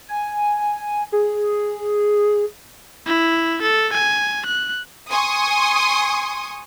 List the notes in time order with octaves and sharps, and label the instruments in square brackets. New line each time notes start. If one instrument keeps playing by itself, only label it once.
[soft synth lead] G#5
G#4
[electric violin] E4
A4
G#5
F#6
[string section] G#5 C6 C#6 D#6